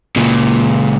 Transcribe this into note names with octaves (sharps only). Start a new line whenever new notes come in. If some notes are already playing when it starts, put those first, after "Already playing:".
C#2 A#2